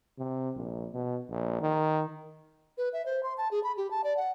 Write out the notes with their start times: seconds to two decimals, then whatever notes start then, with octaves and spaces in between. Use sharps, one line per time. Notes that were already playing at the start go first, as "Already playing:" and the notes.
0.18 C3
0.55 A#1
0.94 B2
1.30 A#1
1.61 D#3
2.78 B4
2.93 E5
3.06 C5
3.23 C6
3.38 A5
3.51 G#4
3.64 B5
3.77 G4
3.91 A5
4.04 D5
4.17 F#5